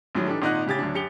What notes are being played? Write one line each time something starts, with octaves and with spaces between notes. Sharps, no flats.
A#1 A2 D#3 F#3
E3 D4 D#4 G4 A4
G#1 A#2 D#4 D#5 F#5 F#6
A2 C#3 G4 G#6 A6
D2 F#3 D4
F#2 G4 C#7 F7 G7